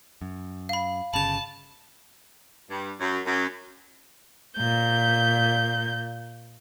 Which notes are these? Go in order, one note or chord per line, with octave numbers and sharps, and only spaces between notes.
F#2
F5 B5
G1 C#3 A5 B5 F7
G2
F#2
F#2
A#2 G6